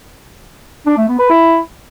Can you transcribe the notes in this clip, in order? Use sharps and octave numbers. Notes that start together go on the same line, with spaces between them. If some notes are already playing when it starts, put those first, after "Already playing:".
D4
A3
B3
B4
E4